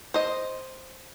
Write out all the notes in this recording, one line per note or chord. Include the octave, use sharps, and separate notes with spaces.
C5 D#5